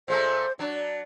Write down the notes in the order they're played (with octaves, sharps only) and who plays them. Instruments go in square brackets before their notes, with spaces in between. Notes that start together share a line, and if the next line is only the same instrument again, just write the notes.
[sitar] A#2 G#3 A3 [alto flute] C5
[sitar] F#3 D4 [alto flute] D5